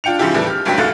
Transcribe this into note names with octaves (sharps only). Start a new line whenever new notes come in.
D4 F4 G5 C#7 F7
G#2 C#3 F3 E4 G4 G#4
D#2 A2 E3 G3
G4 F6
F#1 C#2 G2 F#3 G5 B6
C2 G#2 A3 F5 F#6 A6